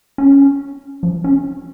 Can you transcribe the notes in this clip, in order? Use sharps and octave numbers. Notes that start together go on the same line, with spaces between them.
C#4
F3
C#4